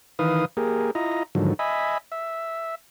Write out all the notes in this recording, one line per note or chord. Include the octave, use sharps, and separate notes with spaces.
D#3 E3 B4 F5 D#6
A#3 G4 G#4 A#4
E4 F4 D#5 A#5
G#2 D3 D#3 F3 F#3
D#5 E5 G#5 B5
E5